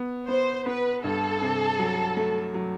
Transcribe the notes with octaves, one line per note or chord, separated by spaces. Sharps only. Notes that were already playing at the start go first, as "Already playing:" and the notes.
Already playing: B3
B3 C5
B3 B4
G2 A4
C3
F#3
A3
F#3